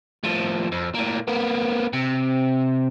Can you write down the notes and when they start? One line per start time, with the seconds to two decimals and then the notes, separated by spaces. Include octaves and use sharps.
0.24 A2 F3
0.72 F2
0.95 A2 A#3
1.28 A#3 B3
1.93 C3